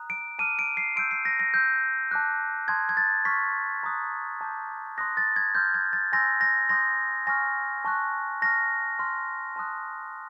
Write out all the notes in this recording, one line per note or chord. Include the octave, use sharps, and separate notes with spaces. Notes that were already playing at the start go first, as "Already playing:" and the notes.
Already playing: A#5 D#6 F#6
D7
A5 D6 F6 D#7
D7
C7
C6 E6 G6 D7
C7
A#6
A#6
C6 E6 G6
A5 D6 F#6
A5 C6 D#6 F#6 G#6
G#6
A6
C#6 F6 B6
A#5 D#6 F#6
A5 D6 G6
C6 D#6 F#6 A#6
A6
G#6
C6 F6 G6
G#6
A6
G#5 C6 E6 G6 A#6
A#6
C6 D#6 G6 A#6
G#5 C#6 F6 A#6
A5 C#6 F#6
A5 C#6 F6 A#6
C6 F6
A5 C6 D#6 F#6